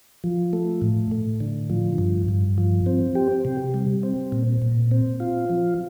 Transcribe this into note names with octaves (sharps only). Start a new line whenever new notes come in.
F3
A3
A2
A2
D3
F3
G2
G2
F3
C4
G4
C3
G3
C4
A#2
A#2
C4
F4
F3